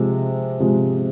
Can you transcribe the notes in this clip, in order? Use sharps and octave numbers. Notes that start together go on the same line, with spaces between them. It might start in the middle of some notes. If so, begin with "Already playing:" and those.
Already playing: C3 F3 G#3
C3 F3 G#3